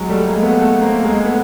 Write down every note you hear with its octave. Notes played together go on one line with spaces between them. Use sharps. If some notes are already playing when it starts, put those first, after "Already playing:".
Already playing: F#3 G#3
G3 A3
G#3 A#3
A3 B3
A3 B3
A#3 C4
G#3 A#3
A3 B3